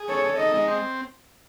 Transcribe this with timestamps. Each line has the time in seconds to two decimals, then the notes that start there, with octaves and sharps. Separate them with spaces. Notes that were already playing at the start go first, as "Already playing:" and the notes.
Already playing: G#4
0.09 A4 C#5
0.24 A4
0.38 D#4 D#5
0.54 G#3
0.68 C4